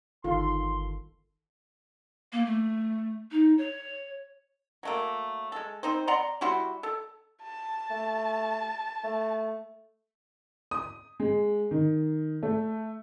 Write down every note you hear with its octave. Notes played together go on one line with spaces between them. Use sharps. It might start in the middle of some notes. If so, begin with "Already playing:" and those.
G1 D#3 F4 A4 C6
A#3
A3
D#4
C#5
F#3 A3 A#3
G#3 A4
C4 D#4 C5
D5 F#5 A#5 C6
G3 E4 F#4 C6
A4
A5
A3
A3
D#6
G#3
D#3
A3